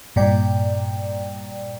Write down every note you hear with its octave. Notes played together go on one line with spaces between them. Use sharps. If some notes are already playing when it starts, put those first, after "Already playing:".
G2 A#2 D5 G5